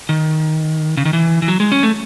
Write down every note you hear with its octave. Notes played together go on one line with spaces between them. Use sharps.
D#3
C#3
D#3
E3
E3
F#3
G#3
C#4
A3